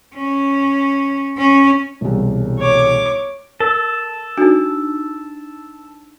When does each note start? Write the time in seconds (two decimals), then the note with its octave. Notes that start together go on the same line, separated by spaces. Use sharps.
0.15 C#4
1.38 C#4
2.01 E1 C2
2.58 C#5 D6
3.60 A4 A#4
4.38 D4 D#4 F#4